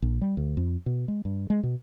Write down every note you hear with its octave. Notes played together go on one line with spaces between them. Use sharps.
A#1
G3
D2
F2
B2
G#3
G2
G#3
B2